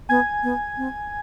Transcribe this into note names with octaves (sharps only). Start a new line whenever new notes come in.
B3 G#5 G#6
B3
C4